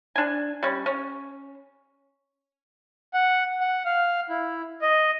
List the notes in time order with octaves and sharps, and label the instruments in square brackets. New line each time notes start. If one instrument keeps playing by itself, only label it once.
[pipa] D4 G#5
G3 C#4
C#4
[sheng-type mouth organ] F#5
F#5
F5
E4
D#5